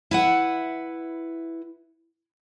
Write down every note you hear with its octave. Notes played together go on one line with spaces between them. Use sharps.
E4 B4 F#5